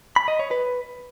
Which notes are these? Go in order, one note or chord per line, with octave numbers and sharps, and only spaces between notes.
B5
D#5
C#5
B4